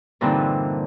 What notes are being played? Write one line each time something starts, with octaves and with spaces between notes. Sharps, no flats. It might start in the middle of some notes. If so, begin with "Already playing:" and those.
G2 A#2 D3 E3 C4 D#4